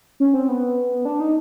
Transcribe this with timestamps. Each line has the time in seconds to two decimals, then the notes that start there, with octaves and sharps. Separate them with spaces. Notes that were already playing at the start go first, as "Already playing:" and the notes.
0.20 C#4
0.34 C4
0.49 B3
1.05 D4
1.20 D#4